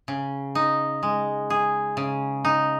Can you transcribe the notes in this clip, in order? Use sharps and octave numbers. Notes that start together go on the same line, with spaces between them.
C#3
D#4
G#3
G#4
C#3
D#4